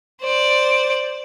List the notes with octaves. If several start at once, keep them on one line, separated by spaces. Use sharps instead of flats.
C5 D5